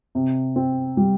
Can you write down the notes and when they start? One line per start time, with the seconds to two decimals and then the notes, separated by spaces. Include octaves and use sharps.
0.15 C3
0.56 C4
0.97 G3